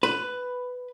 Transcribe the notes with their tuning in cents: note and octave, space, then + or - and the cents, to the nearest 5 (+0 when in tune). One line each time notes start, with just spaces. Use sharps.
B4 +10